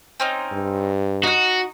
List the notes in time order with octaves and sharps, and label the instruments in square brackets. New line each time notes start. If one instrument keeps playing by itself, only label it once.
[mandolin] C4 C#4 D#4
[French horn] G2
[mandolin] D#4 F#6 [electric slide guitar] F#4